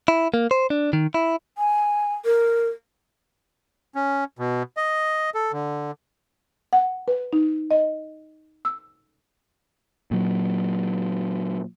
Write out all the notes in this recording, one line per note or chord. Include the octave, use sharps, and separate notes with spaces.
E4
A#3
C5
D4
D#3
E4
G#5
A#4
C#4
B2
D#5
A4
D3
F#5
B4
D#4
D#5
E6
A#2 F#3